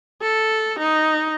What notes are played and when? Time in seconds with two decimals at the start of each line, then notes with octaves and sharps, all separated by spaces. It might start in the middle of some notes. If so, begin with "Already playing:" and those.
0.21 A4
0.79 D#4